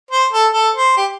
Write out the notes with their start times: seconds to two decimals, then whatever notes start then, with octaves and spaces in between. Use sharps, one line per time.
0.11 C5
0.32 A4
0.53 A4
0.75 C5
0.97 G4